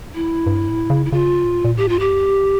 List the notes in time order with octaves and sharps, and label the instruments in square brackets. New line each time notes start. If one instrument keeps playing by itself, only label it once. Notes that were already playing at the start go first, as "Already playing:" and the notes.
[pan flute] E4
[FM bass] G2
A2
C#3
[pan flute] E4
[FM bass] C#3 [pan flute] F4
[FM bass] A#2
A#2
[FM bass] A2 [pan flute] G4
[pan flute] F4
[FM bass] G2
[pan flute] G4
[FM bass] F2